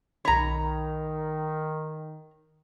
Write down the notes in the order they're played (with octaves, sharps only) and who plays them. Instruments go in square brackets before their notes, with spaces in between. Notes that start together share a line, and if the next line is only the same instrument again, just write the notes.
[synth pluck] B1 B5 [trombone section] D#3 [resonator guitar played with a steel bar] C#5 A#5